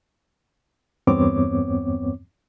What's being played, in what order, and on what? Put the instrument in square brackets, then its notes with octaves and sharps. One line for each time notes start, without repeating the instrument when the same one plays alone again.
[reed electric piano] E2 G2 B3 C4 C#5 D6